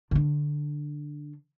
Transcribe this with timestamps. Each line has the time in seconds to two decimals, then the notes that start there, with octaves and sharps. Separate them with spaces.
0.11 D3 D4